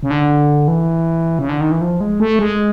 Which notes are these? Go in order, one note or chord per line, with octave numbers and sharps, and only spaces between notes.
C#3
D3
E3
C#3
D3
D#3
E3
F3
G#3
A3
G#3